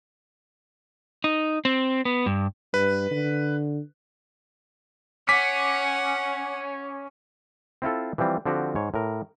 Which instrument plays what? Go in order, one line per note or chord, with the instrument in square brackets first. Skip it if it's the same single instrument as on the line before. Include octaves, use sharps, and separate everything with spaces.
[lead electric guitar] D#4
C4
B3
G2
[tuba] G2 [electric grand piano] B4
[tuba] D3
[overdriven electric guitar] C#4 [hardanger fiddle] F#5 [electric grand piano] D6 B6
[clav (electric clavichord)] C4 E4 F4 A4
E3 F3 G3 C4
D3 F3 C4 F#4 G4
G#2 C#5
A2 A#4